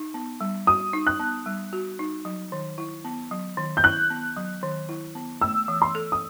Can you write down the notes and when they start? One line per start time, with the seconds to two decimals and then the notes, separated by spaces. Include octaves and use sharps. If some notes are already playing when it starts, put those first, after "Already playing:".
Already playing: D#4
0.14 B3
0.41 G3
0.67 F#4 D#6
0.93 D#4
1.07 F#6
1.20 B3
1.46 G3
1.73 F#4
1.99 D#4
2.25 F#3
2.52 D#3
2.78 E4
3.05 B3
3.31 F#3
3.57 D#3
3.77 G6
3.84 E4 F#6
4.10 B3
4.37 F#3
4.63 D#3
4.89 E4
5.15 B3
5.41 A3 E6
5.68 E3
5.82 C6
5.95 A4
6.12 D#6